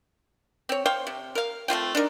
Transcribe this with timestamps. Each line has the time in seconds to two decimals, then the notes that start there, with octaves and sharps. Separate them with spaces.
0.69 C4 C#5
0.86 C5 C#5 F5 G5
1.07 C3
1.35 A#4 F5
1.68 A3 C4 F4 G5
1.95 D4 D#4 A#4